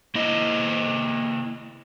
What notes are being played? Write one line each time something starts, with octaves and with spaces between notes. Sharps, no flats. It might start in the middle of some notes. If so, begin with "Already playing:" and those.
A#3 E4 D#5